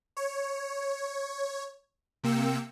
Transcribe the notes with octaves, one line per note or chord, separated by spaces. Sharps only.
C#5
C3 A#3 G5 E6 C#7